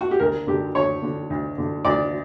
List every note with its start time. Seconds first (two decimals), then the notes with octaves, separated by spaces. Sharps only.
0.01 F#4
0.11 G4
0.19 D2 A#4
0.47 D3 G4
0.75 D2 C#5
1.03 D3
1.30 D2
1.58 D3
1.85 D2 D5